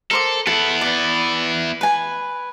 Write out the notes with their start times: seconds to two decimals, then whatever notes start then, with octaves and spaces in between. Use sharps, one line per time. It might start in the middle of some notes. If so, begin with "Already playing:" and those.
0.11 A4 A#4 C5 D6
0.47 B3 E4 A4
0.81 B4 D5
1.81 B4 G#5